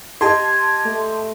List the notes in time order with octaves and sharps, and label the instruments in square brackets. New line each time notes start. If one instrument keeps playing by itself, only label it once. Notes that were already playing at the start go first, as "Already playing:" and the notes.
[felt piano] G4 D#5 [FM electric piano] A5 C6 [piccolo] G#6
[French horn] A3